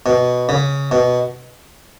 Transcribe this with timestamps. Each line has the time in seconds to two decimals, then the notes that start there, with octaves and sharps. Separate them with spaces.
0.06 B2
0.49 C#3
0.91 B2